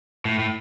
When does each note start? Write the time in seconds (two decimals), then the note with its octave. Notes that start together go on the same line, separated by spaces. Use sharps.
0.25 A2
0.39 A2